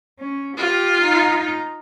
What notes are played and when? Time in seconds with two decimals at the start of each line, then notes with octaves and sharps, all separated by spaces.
0.19 C#4
0.57 F4 G4
1.03 D#4